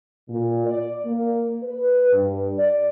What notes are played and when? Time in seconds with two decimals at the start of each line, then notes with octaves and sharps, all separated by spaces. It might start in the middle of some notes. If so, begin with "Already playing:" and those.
0.29 A#2
0.67 D5
1.05 A#3
1.63 B4
2.12 G2
2.58 D5